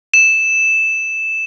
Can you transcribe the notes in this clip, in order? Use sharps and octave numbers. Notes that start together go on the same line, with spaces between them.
E7